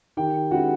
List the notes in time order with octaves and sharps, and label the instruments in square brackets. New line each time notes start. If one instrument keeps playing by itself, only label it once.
[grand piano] D#3 G4 G5
G#3 C#4 E4 F#4 F#5